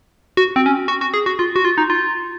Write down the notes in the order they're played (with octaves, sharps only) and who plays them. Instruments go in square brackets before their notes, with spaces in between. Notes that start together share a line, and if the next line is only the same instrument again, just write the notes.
[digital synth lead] F#4
C4
C#4
F#4
F#4
G#4
F#4
F4
F#4
F4
D#4
F4